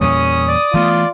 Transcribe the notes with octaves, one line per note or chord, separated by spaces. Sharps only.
E2 A#2 G3 C#4 D#6
D5
E3 A3 B3 F4